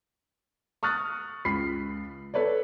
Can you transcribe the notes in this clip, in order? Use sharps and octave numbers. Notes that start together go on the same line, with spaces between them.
C#6 D#6 F6 F#6 A6
C#2 B5 C7
A4 B4 C#5 D5